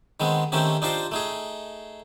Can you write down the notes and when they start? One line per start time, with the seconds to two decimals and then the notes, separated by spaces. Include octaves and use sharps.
0.20 D#3 G#3 B3 C4
0.52 D#3 A3 C4 C#4 D#4 G4
0.82 D4 D#4 F4 G4 C5 D5
1.12 A3 D#4 G#4